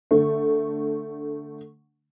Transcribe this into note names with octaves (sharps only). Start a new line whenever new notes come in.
D3 A3